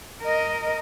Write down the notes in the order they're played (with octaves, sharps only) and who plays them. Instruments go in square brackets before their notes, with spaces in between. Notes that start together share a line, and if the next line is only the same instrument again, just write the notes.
[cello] A#4 D#5